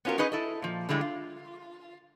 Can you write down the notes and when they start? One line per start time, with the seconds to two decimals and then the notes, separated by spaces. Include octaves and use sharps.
0.05 B3 C#4 F4 F#4 A#4
0.18 C#4 D#4 G#4 B4 D#5
0.32 E4 A4 D#5
0.62 A#2 F3
0.89 D3 G3 G#3 E4
1.01 F4